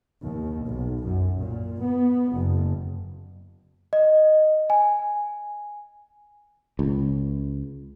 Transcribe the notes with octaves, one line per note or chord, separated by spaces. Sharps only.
D#2
B1
F#2
A#2
B3
F#1
D#5
G#5
C#2